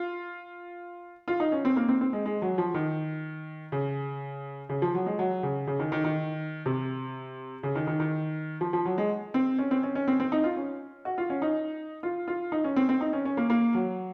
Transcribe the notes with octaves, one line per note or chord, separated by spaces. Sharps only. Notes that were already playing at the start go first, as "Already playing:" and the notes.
Already playing: F4
F4
D#4
C#4
C4
A#3
C4
C4
G#3
G#3
F#3
F3
D#3
C#3
C#3
F3
F#3
G#3
F#3
C#3
C#3
D#3
D#3
D#3
C3
C#3
D#3
D#3
D#3
F3
F3
F#3
G#3
C4
C#4
C4
C#4
C#4
C4
C4
D#4
F4
C#4
F#4
F4
C#4
D#4
F4
F4
D#4
C#4
C4
C4
D#4
C#4
C#4
A#3
A#3
F#3